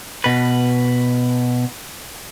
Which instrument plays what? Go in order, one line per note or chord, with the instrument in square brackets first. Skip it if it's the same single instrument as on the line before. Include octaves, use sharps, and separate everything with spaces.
[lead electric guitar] B2 B4